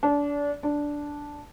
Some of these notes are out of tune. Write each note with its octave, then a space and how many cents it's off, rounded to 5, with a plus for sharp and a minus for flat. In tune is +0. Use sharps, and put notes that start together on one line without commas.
D4 -25
D4 -5